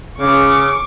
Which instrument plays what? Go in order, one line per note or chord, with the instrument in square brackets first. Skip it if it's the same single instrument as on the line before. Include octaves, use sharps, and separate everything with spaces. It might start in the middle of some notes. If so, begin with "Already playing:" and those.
[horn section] C#3 [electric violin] C#6 D6